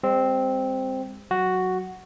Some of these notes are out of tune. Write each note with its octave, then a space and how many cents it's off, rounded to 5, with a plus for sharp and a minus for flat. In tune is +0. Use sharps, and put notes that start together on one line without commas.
G#3 -45 C4 +0
F#3 +0 F#4 +0